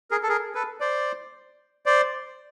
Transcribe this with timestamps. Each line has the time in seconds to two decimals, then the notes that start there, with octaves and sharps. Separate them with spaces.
0.11 G#4 A#4
0.23 A4
0.29 G#4 A#4
0.55 A4 B4
0.80 C5 D5
1.86 C5 D5